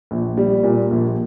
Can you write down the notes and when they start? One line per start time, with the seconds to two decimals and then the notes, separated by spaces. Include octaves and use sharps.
0.11 A#1
0.37 G3
0.63 A#2
0.91 A#1